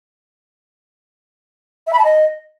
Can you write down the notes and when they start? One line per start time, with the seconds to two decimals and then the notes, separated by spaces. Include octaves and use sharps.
1.87 E5
1.93 B5
1.99 A5
2.04 D#5